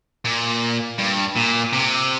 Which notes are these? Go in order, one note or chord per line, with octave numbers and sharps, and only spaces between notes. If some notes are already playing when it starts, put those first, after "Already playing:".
A#2
G2
A#2
C3